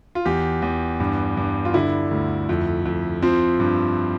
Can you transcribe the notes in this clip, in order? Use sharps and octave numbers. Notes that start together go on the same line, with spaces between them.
F4
E2 G4
E2
G2
G2
F4
D3 E4
D2
F2
F2
F3 C4
G2